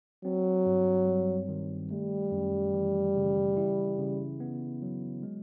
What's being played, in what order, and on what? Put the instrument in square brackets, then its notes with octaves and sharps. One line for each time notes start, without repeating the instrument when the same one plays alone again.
[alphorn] F#3 [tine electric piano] C4
[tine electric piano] G2
G3
D#3
[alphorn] G3 [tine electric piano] A3
[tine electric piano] F#2
E3
C#3
E4
C#3
B3
F#3
G#3